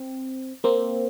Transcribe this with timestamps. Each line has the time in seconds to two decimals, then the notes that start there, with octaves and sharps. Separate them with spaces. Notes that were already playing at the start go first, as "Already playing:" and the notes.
Already playing: C4
0.64 A#3 C4